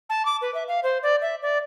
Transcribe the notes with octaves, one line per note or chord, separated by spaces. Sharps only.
A5
D6
B4
E5
F5
C5
D5
E5
D5